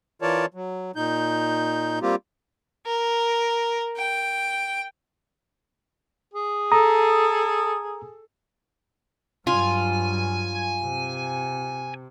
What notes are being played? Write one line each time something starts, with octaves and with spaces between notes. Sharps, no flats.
E3 F4 A#4 C#5 D5 A5
F#3
A#2 D#4 G6
G3 A#3 C4 F4 G4
A#4
G5
G#4
A4 A#5 D#6
G2 F#3 F4 G#5
C3